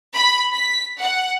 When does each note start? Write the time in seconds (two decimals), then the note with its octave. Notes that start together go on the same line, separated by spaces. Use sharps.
0.14 B5
0.53 B6
0.99 F#5